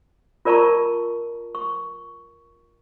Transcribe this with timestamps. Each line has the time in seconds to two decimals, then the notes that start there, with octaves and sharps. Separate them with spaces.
0.45 F4 A#4 D5 A5 A#5 C#6
1.55 C#6